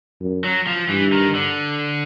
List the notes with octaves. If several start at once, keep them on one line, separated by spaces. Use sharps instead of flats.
F#2
F#3
F3
G2 E3
D#3
D3